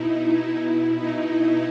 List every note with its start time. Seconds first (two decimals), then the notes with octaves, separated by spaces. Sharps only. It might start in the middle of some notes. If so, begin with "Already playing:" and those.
Already playing: B2 D#4 E4
0.24 E4
0.60 B2
0.95 D#4
1.31 E4